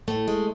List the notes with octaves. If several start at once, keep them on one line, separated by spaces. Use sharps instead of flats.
A2 A3
G#3